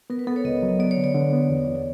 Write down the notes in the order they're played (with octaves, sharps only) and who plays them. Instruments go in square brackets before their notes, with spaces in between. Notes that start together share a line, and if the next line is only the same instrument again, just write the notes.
[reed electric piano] B3 [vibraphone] A#4
[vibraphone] B4
[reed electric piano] B3 [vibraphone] A4
[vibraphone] C#5
[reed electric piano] C#2 [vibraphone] D#5
[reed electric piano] F#3
[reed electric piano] B3 [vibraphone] D5
[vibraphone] C#5
[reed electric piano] D3
[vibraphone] D5
[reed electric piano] D3
B3
E2
E2